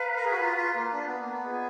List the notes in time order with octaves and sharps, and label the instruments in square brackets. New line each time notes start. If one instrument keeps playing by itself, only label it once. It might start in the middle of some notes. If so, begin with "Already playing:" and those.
Already playing: [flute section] B4 F5 A#5
[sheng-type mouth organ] A#4
G#4
F#4
F4
F4
A#3
D4
B3
A#3
B3
[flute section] F4 G#4 D#5